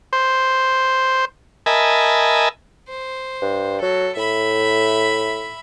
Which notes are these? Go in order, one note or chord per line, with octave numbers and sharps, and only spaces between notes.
C5
A#4 D#5 E5 G#5 A5 B5
C5
G2
F#3 A4
A2 E5 B5